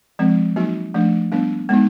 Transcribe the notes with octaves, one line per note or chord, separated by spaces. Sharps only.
F3 G#3 C4
F#3 A#3 D#4 F#4
F3 A3 D4
G3 B3 D4
G#3 B3 D#4